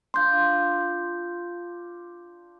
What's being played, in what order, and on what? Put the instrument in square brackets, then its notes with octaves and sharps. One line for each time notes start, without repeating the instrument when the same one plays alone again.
[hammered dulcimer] D4 F4 [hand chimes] C6 G6